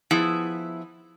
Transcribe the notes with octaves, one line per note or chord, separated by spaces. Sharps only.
F3 B3 E4 G#4